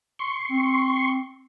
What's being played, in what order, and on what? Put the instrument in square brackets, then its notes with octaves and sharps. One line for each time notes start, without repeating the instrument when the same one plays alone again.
[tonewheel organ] C6 C#6
[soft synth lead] C4